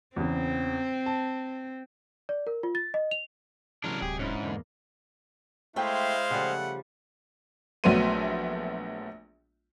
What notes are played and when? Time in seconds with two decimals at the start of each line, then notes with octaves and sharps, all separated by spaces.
0.16 E2 C#3 C4
1.06 A5
2.29 D5
2.47 A#4
2.63 F4
2.75 A6
2.94 D#5
3.11 F7
3.84 C3 E3 F#3 G#3 C#4 D4 A#4
4.02 D1 G4 G#4
4.19 G#2 C#4 D4 E4
4.43 E2 D3 A#3
5.76 G#3 A3 E4 C5 E5 F5 G5
6.31 C#3 F3 G3 A3 F#5
7.84 A#1 F#3 A3 B3 C6 D#7